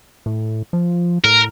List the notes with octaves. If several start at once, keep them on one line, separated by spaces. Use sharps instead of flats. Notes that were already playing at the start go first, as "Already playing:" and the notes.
A2
F3
A2 A#4